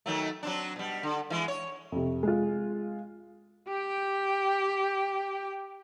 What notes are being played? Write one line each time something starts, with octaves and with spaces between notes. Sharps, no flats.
D#3 F#3 A3
F#3 C4 D4
B2 G3
D3
E3 G#3
C#5
F2 C3
G#3 F4
G4 G5